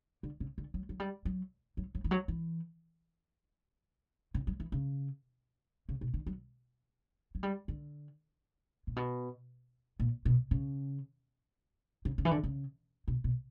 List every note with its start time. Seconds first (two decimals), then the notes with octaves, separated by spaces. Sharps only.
0.23 D3
0.40 C#3
0.58 D3
0.74 F#3
0.89 F#3
1.00 G3
1.25 F#3
1.77 F#3
1.95 F#3
2.04 E3
2.11 F#3
2.28 E3
4.34 C#3
4.47 F#3
4.60 E3
4.72 C#3
5.89 C#3
6.01 B2
6.14 D3
6.26 F#3
7.35 F#3
7.43 G3
7.68 D3
8.87 A#2
8.96 B2
9.99 A#2
10.25 B2
10.51 C#3
12.05 C#3
12.18 C#3
12.25 E3
12.31 D3
12.43 C#3
13.08 B2
13.24 B2